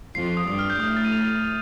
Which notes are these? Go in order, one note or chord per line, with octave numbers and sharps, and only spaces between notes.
F2 F3 C7
C7
D#6
G2 G3 D#6
F6
G6
A2 A3 D#6
F6
A6
D#7
F7